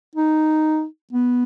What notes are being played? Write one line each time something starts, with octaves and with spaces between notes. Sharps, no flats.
D#4
B3